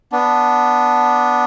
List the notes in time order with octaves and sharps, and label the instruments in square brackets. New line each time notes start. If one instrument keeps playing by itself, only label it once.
[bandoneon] B3 D4